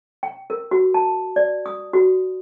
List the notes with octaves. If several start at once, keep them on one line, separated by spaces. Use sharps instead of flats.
G5
A#4
F#4
A5
D5
D#6
F#4